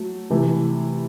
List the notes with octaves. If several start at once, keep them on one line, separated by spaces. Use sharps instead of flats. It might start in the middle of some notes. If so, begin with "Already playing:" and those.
Already playing: F#3 A3
C3 E3 A3 E4